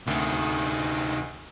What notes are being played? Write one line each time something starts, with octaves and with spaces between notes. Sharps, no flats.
D2 C3 D#3